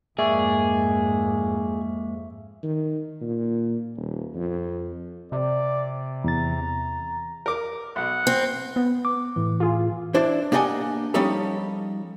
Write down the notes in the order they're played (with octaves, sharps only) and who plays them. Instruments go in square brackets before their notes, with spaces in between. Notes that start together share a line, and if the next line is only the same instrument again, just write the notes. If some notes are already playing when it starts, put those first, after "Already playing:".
[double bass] F2 G#2 [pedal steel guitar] G#3 A#3 D5 [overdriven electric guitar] G#4 [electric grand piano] E5 C#6
[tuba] D#3
A#2
D#1
F2
[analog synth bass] C3 [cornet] D5
[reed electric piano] E2 A6 [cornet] A#5
[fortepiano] A#4 D6
[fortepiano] B1 [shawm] F#5
[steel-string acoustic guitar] C4
[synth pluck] B3
[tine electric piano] D6
A2 E3
[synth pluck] F4 G#4
[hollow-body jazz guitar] D4 E4 C5 D5
A#3 D4 G4 D#5 F#5 G#5
F3 G3 C#4 D#4 G4 A4